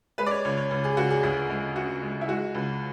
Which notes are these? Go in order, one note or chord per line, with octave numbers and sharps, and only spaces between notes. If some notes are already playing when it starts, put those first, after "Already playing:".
G#3 B4
D5
C#5
C#2 C#5
C#5
C#2
G#4
C#2 F#4
G#4
D2 G#4
G#3
C#3 F#4
G#3
E4
G#3 F#4
C#2